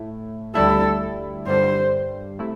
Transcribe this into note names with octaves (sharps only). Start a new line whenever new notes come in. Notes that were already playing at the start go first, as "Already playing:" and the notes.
Already playing: A2 A3 E4
D2 D3 G3 E4 A4
G2 D3 G3 C5
C3 A3 E4